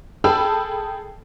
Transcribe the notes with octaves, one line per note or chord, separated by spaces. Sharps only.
G#4 A4 G5 A5 B5 E6